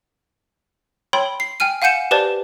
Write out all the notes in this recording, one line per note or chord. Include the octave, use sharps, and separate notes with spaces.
C#5 G5 B5 C6
C7
G5 G#5 F6 D#7
F5 F#5 G#5 G6 C#7 E7
G4 B4 C5 D5 A5